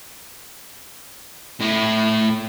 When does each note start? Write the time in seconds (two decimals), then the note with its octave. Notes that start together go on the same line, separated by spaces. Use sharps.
1.60 A2 E4